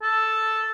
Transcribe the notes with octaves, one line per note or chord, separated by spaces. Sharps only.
A4